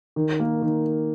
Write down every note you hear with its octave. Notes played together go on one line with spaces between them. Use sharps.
D#3
A#3
D#3